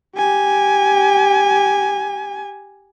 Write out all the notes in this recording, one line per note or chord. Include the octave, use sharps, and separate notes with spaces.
G4 G#5